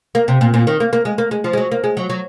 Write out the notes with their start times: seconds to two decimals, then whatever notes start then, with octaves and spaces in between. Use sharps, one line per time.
0.15 A#3
0.28 C3
0.41 A#2
0.54 A#2
0.67 D#3
0.80 A#3
0.93 A#3
1.05 G#3
1.18 A#3
1.31 G#3
1.44 F3
1.53 G#3
1.57 F#3
1.71 A#3
1.84 G#3
1.97 F#3
2.10 F#3